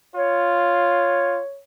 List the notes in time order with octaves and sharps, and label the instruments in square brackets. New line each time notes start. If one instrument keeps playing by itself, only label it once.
[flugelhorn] F4 [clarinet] C#5